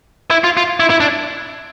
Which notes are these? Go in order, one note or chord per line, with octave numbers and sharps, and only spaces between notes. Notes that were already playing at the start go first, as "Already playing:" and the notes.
E4
F4
F4
E4
E4
D4